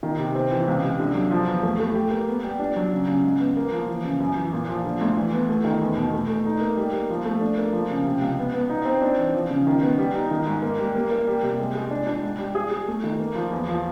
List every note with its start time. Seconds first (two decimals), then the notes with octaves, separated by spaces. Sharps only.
0.03 D#3
0.18 C3
0.35 C4
0.51 E3
0.68 C#2
0.84 C3
1.00 D3
1.15 F#3
1.31 F3
1.47 E2
1.63 A3
1.80 A3
1.95 G4
2.11 A#3
2.28 B3
2.44 G3
2.59 D4
2.76 F#3
2.92 C#3
3.07 C#3
3.24 G#2
3.40 B3
3.57 A#3
3.72 F3
3.89 E3
4.04 C#3
4.20 F#2
4.36 E3
4.53 A#2
4.69 F3
4.85 D3
5.01 D2
5.17 E3
5.33 B3
5.49 A3
5.65 D#3
5.81 E2
5.97 B2
6.13 A3
6.30 A3
6.46 D#4
6.61 A#3
6.77 G3
6.94 A#3
7.10 F3
7.25 A3
7.41 D4
7.58 A#3
7.73 F3
7.90 C#3
8.05 C3
8.22 C#2
8.38 B3
8.54 B3
8.69 D#4
8.85 C4
9.01 D4
9.18 E3
9.34 F3
9.50 C#3
9.67 D#3
9.82 B3
9.98 G3
10.14 D#4
10.31 D#3
10.47 G#2
10.62 A#3
10.79 G3
10.95 A#3
11.11 A#3
11.27 G3
11.43 C3
11.60 G#3
11.75 G#3
11.91 D4
12.07 D4
12.23 G#2
12.39 G3
12.55 G#4
12.71 G#4
12.88 A3
13.04 D#3
13.19 A#3
13.35 F3
13.52 E2
13.68 F3